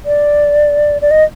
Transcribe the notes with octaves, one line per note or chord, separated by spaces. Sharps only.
D5
D5
D#5